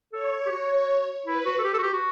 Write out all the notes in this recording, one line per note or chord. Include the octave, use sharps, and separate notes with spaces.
A4 C#5
G4
F#4
E4 B4
F#4
A4
G4
A4
F#4
G4
F#4